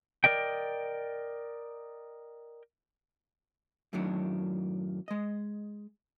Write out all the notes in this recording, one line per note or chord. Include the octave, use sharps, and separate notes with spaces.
A#4 D5 D#5 G5
F#2 A2 D#3 F#3 D4
G#3 D#5